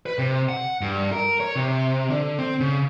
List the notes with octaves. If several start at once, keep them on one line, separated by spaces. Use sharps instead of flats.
B4
C3
F#5
G2
A#4
C#5
C3
D3
C4
C#3